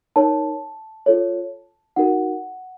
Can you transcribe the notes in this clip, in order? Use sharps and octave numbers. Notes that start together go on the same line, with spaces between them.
D#4 A#4 C#5 A5
F4 A4 C#5
D#4 F#4 A#4 F#5